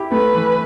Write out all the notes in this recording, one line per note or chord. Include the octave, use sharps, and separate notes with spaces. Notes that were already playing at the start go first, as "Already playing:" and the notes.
Already playing: E4 G4
A3 B4
E3